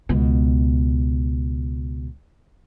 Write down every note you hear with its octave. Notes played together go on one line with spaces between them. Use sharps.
C#2 B2